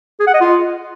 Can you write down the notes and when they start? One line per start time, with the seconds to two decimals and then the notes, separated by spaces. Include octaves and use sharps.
0.20 G#4
0.27 F#5
0.34 D#5
0.41 F4